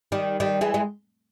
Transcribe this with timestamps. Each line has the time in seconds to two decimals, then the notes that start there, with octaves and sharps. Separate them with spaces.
0.12 D#3 G3
0.40 D#3 G3
0.61 E3 G#3
0.74 G#3